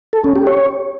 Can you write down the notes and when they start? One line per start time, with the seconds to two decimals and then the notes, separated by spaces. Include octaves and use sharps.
0.13 A4
0.24 C#4
0.36 G4
0.47 C#5